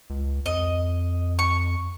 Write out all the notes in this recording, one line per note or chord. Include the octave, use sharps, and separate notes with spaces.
C#2
F2 D#5
C#6